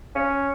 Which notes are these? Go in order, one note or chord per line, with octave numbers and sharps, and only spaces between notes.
C#4